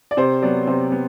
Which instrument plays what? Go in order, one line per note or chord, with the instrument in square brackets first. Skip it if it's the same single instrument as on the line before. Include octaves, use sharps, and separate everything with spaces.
[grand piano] D5
C3 C5
F#3 B3 D5
C3 C5
B3